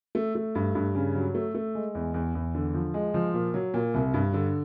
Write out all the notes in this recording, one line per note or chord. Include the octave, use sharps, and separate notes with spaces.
A3
A3
G2
G2
C#3
F#3
A3
A3
G#3
E2
E2
E2
D3
F3
G#3
F3
A#2
F#3
A#2
C2
G2
D3